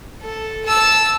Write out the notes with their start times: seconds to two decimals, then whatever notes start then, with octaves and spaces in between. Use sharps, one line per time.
0.22 A4
0.65 A5 E6